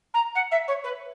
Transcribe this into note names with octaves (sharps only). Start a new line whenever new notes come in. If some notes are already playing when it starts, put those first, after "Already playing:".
A#5
F#5
E5
C#5
B4